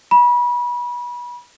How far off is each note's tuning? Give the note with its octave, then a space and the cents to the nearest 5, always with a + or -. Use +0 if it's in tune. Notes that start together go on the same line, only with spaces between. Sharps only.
B5 -30